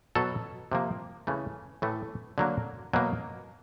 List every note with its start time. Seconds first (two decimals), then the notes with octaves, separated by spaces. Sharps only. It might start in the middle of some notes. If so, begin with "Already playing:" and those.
0.15 B2 F#3 B3 A4
0.72 C3 F3 A#3
1.27 C#3 E3 A3
1.82 A2 E3 A3
2.38 D3 F#3 A#3
2.93 B2 F#3 A#3